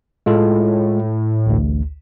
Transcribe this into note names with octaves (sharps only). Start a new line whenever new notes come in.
A2 G#3 F4 A4
A1 D2